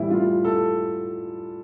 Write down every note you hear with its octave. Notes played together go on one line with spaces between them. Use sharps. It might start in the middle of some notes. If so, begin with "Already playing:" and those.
Already playing: A2 E3 G3 E4
F4
A4